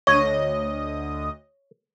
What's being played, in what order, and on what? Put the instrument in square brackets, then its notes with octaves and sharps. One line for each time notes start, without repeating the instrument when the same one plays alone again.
[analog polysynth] D2 D#5 [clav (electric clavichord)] C#5